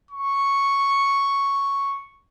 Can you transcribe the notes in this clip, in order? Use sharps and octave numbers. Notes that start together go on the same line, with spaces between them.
C#6